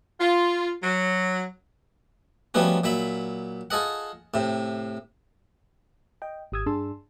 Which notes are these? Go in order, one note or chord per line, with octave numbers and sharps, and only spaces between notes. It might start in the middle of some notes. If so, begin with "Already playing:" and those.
F4
F#3
F3 G3 A3 B3 C#4 F#4
A#2 F#3 E5 B5
F4 G#4 A4 D#5 F#5
A2 C3
D#5 G5
G#1 G4 D#6 E6 G#6
G2 D4 G#4 A5 C6 E6